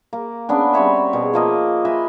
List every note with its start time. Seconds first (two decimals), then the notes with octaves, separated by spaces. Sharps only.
0.13 A#3
0.49 B3 C#4 D4
0.73 G3 C4 C#5 E5
1.13 B2 G#4
1.33 F3 A#3 D#5
1.85 B4 D#5 E5 G#5